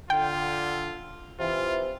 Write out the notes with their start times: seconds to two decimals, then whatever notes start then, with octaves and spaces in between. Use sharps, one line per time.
0.10 D3 F4 G5
1.40 C3 E3 F4